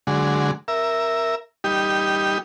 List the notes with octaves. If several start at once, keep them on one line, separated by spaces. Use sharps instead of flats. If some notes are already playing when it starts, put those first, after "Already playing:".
D3 F#3 G#3
A#4 E5
G3 D#4 G4